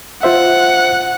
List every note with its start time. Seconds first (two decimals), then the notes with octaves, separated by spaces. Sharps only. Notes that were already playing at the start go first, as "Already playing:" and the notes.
0.23 F4 C5 E5 F#5